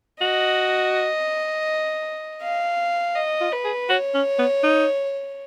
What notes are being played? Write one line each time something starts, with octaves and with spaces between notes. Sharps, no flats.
F#4 D#5
F5
D#5
F4
B4
G#4
F#4 C#5
C#4
B3
D#4